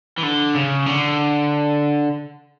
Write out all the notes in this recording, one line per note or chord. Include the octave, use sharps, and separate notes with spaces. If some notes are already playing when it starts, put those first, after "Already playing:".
E3
D3
C#3
D3